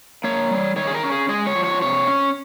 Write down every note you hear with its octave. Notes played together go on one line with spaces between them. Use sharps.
A#3 C#5
G3
D#3 C#5
G#4
A#4
C#4
G#4
G#3 G#4
C#5
F3
C#5
C3 C#5
C#4